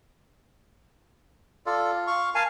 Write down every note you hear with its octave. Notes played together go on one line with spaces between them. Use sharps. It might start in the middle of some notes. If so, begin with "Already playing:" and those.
F4 A4 D5
F5 C#6
A#4 F5 G#5 A5